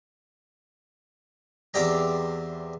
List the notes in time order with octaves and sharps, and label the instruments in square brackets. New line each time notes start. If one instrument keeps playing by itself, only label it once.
[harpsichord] E2 C4 G4 D5 A#5